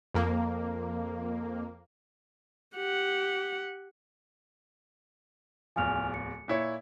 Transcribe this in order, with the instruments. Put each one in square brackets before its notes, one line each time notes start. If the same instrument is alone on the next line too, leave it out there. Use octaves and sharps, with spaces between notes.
[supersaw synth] F2 A#3
[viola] G4 F#5
[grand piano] D1 E2 F3 [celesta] G#5 F6 F7
[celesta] C#7
[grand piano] A#2 E4 C#5